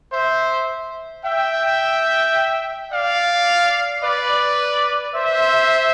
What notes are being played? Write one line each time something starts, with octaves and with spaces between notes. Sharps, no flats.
C5 E5
E5 G5
D5 F5
B4 D5
C5 E5